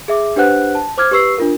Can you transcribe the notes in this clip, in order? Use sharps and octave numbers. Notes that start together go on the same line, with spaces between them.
G#4 E5 D6
D4 G4 B4 C5 F#5 F#6
A5
C5 D6 F6 G#6
G4 B4 C#6 E6 C7
D4 F4 A#4